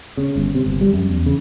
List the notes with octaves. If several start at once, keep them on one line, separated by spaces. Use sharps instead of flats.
C#3
G1
C3
G1
G3
F#2
E2
C#3